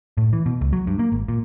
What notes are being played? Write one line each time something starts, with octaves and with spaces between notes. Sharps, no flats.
A2
E3
B2
C#2
F#3
G2
A#3
G#1
A#2